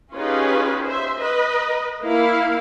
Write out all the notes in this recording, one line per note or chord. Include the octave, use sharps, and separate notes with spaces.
C#4 D#4 F4 G4 G#4 B4
C5 E5
B4 D#5
A#3 E4 F5